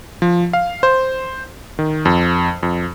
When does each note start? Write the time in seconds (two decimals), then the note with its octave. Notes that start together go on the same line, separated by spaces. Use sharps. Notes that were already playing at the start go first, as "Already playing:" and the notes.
0.22 F3
0.53 F5
0.83 C5
1.79 D#3
2.05 F2
2.63 F2